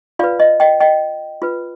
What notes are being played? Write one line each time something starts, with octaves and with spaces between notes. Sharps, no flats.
F4 B4 D5 F5
D#5
D#5 G5
D#5 G5
F4 B4